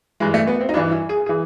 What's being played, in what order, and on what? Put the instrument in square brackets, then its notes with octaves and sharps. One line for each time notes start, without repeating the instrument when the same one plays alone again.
[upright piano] G2 E3 G#3
A3
B3
C4
D#4
G2 E3 D4
E4
G#4
G#4
E3